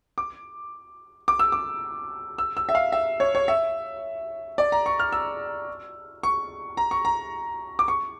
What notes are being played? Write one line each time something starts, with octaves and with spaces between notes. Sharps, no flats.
D6
D6
E6
D6
E6
E6
E5
F5
E5
C#5
C#5
E5
D5
A#5
C#6
F6
E6
C#6
A#5
C#6
A#5
D6
C#6